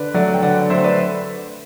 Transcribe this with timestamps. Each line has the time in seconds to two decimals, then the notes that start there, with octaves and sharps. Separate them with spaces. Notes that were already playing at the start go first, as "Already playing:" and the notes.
Already playing: D3 B4 D5
0.14 F#3 A3 D5 F#5
0.34 G5
0.42 D3 D5 F#5
0.70 F#3 A3 C5 E5
0.84 B4 D5